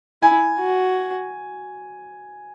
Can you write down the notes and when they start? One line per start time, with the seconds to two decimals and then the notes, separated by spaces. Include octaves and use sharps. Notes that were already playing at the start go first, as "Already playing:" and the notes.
0.22 E4 G#5
0.59 F#4